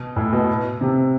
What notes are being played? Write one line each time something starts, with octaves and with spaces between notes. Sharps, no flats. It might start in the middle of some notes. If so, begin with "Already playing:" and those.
Already playing: B2
A2
B2
C3